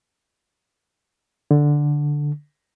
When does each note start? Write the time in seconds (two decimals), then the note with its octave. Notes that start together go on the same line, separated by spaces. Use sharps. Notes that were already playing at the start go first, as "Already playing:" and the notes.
1.51 D3